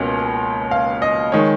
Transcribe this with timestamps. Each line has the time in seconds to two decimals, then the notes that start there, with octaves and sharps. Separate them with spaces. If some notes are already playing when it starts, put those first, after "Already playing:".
Already playing: C#2 B2 A#3 C#4
0.71 F5
1.02 D#5
1.32 D#3 G#3 C#5